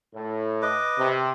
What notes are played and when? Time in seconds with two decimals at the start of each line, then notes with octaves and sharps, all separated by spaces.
0.14 A2
0.62 B4 D#5 D6
0.97 C3